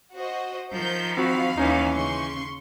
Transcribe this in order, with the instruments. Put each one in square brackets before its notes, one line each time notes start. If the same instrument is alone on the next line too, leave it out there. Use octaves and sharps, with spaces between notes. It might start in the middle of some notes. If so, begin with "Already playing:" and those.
[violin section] F#4 C5 D#5
[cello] D#3 F3 [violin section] A#4 C5 G6
[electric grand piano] C4 F#4 [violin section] F5 B5
[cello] D#2 D#3 [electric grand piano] E3 C#4 D#4
[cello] C#3 [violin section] C6 C#6